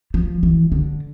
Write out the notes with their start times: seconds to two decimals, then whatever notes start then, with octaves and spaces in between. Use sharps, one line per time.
0.14 F3
0.43 E3
0.72 D3